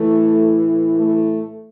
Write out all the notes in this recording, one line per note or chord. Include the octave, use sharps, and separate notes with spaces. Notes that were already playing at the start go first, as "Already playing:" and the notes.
Already playing: A2 E3 A3
A3